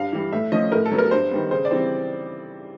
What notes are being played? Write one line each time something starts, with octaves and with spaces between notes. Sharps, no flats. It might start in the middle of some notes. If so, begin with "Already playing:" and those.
Already playing: G2 F5
E3 G3
A2 E5
F3 A3 C#4 D#5
A2 A#4
A4
F#3 B3
A#4
G2 C5
D#3 G3 B3
C#3 C5
D5
E3 G3 C4